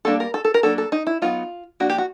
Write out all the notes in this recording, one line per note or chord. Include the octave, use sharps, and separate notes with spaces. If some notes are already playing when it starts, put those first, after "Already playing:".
G3 A#3 D4 A4
A#4
A4
A4
A#4
F#3 A#3 D4 A4
A4
D#4
E4
F#3 B3 D#4 F4
F3 A#3 D4 F#4
G4
F#4